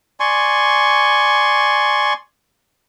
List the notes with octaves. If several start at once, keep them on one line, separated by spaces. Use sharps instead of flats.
D5 G#5 C6 C#6